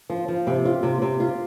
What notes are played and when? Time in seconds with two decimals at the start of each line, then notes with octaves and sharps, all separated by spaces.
0.10 F3
0.28 F3
0.47 C3
0.65 F4
0.83 C3
1.02 C3
1.20 F4